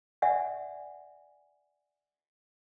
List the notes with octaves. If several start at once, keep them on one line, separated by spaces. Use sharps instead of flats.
D5 E5 F#5 G#5